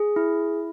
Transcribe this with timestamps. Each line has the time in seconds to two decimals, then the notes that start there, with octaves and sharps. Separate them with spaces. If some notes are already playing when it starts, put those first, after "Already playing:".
Already playing: G#4
0.16 E4